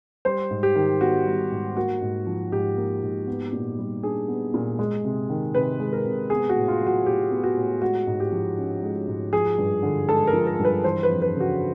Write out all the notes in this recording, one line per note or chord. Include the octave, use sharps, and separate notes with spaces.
G3 C5
G#2
G4
D#3
B3 F#4
G3
G#2
A#3 F#4
G#2
F3
G#2 G4
A#3
G#2
B3
A#2
G3
D4 G#4
B3
A#2
G#3
C3
D#3
C3 B4
G#3
A#4
C3
B3 G#4
F#4
A2
F4
F#3
F#4
A2 G4
B3
F#4
A2
G#3 F#4
G#2
G4
F3
C#4
G#3
G#2
F3 G#4
G2
D3
G#3 A4
A#4
F3
A#4
G2
B4
E3 C5
B4
F2
B4
C#3
F#4